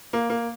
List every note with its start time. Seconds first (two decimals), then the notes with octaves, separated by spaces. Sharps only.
0.13 A#3
0.30 A#3